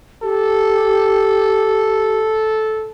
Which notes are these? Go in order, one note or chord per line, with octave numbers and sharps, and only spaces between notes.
G4 A4